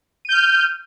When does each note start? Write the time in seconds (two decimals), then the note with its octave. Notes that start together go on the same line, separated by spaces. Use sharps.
0.25 D#7
0.29 G6
0.32 F6